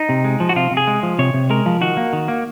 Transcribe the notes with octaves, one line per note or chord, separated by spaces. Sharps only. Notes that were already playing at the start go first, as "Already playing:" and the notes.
Already playing: D#4
C3
G#3
F3
F#4
C3 F4
C3
G#4
G#3
F3
C3 C#5
C3
G#3 A#4
F3
D#3 F#4
A#3
D#3
A#3